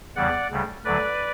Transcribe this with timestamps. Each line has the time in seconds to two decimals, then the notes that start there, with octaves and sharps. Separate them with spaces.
0.16 E2 C#3 E3 G3 D5 F#5
0.51 D2 C#3 G3
0.84 D2 D3 F#3 B4 D5